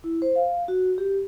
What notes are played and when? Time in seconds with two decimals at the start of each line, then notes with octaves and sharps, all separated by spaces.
0.04 E4
0.22 C5
0.36 F5
0.68 F#4
0.98 G4